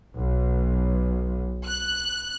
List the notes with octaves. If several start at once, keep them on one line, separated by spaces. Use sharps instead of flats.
B1
F#6